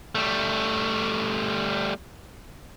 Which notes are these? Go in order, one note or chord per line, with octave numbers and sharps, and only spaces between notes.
G3 A3